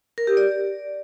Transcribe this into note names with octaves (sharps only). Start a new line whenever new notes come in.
A#4
G4
D5